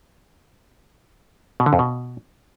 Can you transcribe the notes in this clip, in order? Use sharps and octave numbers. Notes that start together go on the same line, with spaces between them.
B2
D3
F2
B2